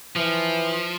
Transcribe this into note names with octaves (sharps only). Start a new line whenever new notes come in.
E3 F3